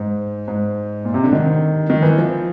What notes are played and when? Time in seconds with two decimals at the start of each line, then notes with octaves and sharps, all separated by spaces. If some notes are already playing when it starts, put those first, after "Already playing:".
Already playing: G#2
0.48 G#2
1.05 A#2
1.14 C3
1.24 D3
1.33 D#3
1.90 D#3
2.03 E3
2.18 F3